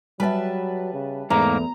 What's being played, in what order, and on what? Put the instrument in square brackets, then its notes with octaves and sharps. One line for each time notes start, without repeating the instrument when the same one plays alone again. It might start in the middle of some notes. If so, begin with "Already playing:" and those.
[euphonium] F#3 [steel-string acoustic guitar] G3 E5 [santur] B4 A5
[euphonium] C#3
[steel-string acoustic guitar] E2 [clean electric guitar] G#2 A#3 [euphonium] A3 [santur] A#5